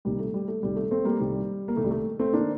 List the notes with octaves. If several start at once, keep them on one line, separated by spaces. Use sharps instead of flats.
C2 C3 D#3 G3 A#3
A3
G3
A3
C2 C3 D#3 G3
A3
A3 C4
G3 A#3
C2 C3 D#3 G3
A#3
C2 C3 D#3 A3
G3
A3
A3 C4
D#3 A#3 D4